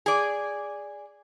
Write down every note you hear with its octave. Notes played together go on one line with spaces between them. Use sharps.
G#4 D5